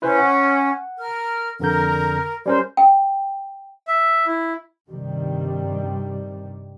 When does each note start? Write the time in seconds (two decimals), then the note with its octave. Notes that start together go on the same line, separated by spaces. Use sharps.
0.02 C#4 E4 B4 C5
0.18 F#5
0.99 A#4 F6
1.60 F2 D3 A#4 G6
2.46 G3 C#4 A#4 C5
2.77 G5
3.88 E5
4.27 E4
4.90 G2 C3 D#3 G3